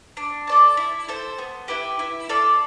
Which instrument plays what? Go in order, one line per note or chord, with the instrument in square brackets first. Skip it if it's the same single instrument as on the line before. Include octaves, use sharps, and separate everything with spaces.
[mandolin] D4
A4 D5 A5
E4
A4 C5
B3
E4 G4 B4
E4
A4 D5 F5